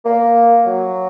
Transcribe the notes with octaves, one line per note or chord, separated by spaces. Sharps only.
A#3
F#3